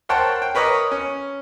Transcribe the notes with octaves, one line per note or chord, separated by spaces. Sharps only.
A#4 C5 C#5 F#5 G5 A5
G5
A#4 B4 C#5 D#5 A#5 D6
C#4